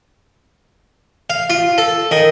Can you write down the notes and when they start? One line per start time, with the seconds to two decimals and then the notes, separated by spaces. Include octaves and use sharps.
1.30 F5
1.50 F4
1.78 A4
2.11 D#3